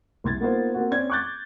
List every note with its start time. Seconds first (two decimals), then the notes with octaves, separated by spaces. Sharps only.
0.24 C2 C6 G#6 A6
0.40 A#3 B3 D#4 F4 C5
0.74 A#3 C4 F#4
0.91 C4 C#4 D5 G#6
1.10 C#6 D6 F#6 G6 A6